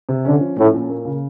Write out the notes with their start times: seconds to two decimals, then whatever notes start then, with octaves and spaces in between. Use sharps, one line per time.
0.09 C3
0.25 D3 C#4
0.41 F3
0.58 A2 C#4
0.74 A#2
0.90 A#3
1.05 C#3